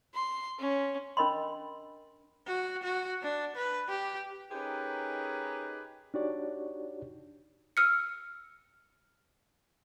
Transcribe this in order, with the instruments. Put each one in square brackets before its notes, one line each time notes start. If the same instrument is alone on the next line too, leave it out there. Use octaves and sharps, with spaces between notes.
[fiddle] C6
C#4
[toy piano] C#4 D4 A#4 D#5 B5 C6
[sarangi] F#4
F#4
D4
B4
G4
[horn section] C#4 D#4 G4 G#4 A#4 B4
[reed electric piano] D4 D#4 F#4 G4 C#5 D5
[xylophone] E6 F6 C#7